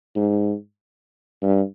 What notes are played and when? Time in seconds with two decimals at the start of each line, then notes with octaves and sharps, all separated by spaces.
0.16 G#2
1.42 G2